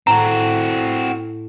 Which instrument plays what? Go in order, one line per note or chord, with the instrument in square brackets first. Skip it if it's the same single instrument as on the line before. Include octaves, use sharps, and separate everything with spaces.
[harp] A2 [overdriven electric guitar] C4 F#4 [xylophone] A#5